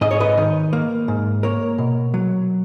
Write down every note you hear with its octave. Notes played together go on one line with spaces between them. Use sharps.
G#2 D#5
C#5
B4 D#5
D#3
A#3
G#2
A#3 A#4 C#5
B2
F#3